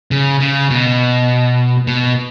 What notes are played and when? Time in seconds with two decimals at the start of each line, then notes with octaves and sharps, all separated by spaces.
0.11 C#3
0.40 C#3
0.70 B2
1.87 B2